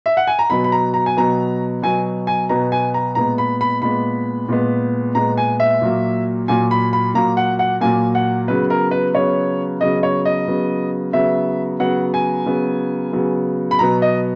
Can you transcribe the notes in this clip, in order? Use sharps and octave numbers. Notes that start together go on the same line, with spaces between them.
E5
F#5
G#5
A#5
B2 F#3 B3 B5
B5
A#5
A#5
G#5
B2 F#3 B3 A#5
B2 F#3 B3 G#5
G#5
B2 F#3 B3 A#5
G#5
A#5
A#2 G#3 B3 A#5
B5
B5
A#2 G#3 B3 B5
A#2 G#3 B3
A#2 G#3 B3 A#5
G#5
E5
A#2 F#3 A#3
A#2 F#3 A#3 G#5
B5
B5
A#2 F#3 A#3 A#5
F#5
F#5
A#2 F#3 A#3 G#5
F#5
C#3 F#3 B3 B4
A#4
B4
C#3 F#3 B3 C#5
C#3 F#3 B3 D#5
C#5
D#5
C#3 F#3 B3
C#3 F#3 B3 E5
C#3 F#3 B3 F#5
G#5
C#3 F#3 B3
C#3 F#3 B3
B5
B2 F#3 B3 A#5
D#5